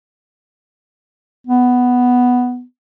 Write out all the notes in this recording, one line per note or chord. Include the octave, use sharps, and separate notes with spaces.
B3